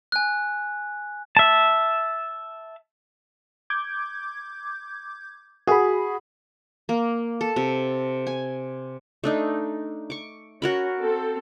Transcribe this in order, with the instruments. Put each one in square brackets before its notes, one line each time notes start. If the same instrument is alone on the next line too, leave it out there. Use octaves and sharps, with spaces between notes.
[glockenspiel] G#5 F#6
[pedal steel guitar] E5 A5
[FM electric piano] D6 G6 G#6
[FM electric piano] F#4 B5 [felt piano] G#4
[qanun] A#3
A4
C3
G#5
A3 D4 D#4
C#6 D6
[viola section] C#4 [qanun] F#4 A#4 B5
[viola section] C4 A4